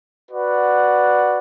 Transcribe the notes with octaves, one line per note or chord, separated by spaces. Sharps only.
F#4 B4 D5 F#5